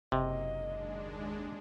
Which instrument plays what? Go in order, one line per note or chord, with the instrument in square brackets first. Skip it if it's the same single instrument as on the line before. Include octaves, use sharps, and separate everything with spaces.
[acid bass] F#1 [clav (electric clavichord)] C3 [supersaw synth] F#3 A#3 [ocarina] D#5
[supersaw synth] D#2 G#3 D4